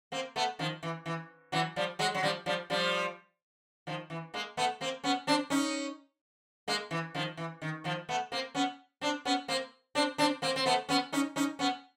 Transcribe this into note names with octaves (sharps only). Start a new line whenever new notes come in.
A#3 C4
A3 B3
D#3 F3
E3
E3
E3 F#3
F3 G3
F#3 G#3
F#3
F3 G3
F3 G3
F3 G3
D#3 F3
E3
G#3 A#3
A3 B3
A#3 C4
B3 C#4
C4 D4
C#4 D#4
G#3 A#3
E3
D#3 F3
E3
D#3
D#3 F3
A3 B3
A#3 C4
B3 C#4
C4 D4
B3 C#4
A#3 C4
C4 D4
C4 D4
A#3 C4
C4
A3 B3
B3 C#4
C#4 D#4
C#4 D#4
B3 C#4